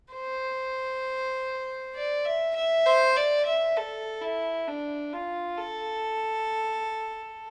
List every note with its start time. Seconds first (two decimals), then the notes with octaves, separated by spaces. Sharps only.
0.14 C5
1.95 D5
2.25 E5
2.56 E5
2.86 C5
3.16 D5
3.46 E5
3.77 A4
4.22 E4
4.67 D4
5.13 F4
5.58 A4